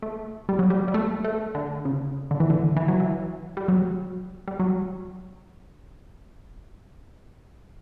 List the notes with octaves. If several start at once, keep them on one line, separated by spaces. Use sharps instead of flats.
A3
G3
F#3
G3
G3
A3
A3
D3
C#3
D3
E3
D3
E3
F#3
E3
G3
F#3
G3
F#3